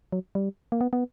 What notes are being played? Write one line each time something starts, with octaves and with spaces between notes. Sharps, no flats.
F#3
G3
A#3
B3
B3